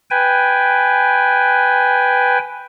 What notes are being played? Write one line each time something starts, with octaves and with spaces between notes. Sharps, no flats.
B4 G5 G#5